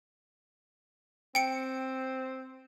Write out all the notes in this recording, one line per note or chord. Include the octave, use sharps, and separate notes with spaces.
C4 G5 C#7